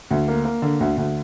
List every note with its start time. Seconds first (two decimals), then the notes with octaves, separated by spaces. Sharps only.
0.11 D2
0.28 A#3
0.45 A#3
0.62 D3
0.81 D2
0.97 D2